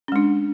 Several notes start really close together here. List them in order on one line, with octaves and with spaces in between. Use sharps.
C#4 G#3 D4